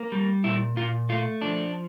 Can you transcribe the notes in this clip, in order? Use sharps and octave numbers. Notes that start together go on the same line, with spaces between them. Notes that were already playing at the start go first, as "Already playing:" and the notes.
Already playing: A#3
G3
A#2 E4
A#2 F4
A3 F4
F3 D4